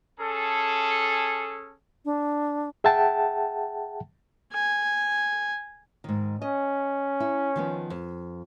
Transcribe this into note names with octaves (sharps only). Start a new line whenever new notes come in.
C#4 G#4 A4
D4
G#4 E5 F#5 G5 A5
G#5
G#2 D#3
C#4 D#5
E4
D#3 F3 B3
F2